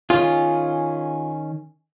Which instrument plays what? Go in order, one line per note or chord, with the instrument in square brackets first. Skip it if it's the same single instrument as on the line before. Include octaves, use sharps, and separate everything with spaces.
[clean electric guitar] D#3 C#4 G#4 [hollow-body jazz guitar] F4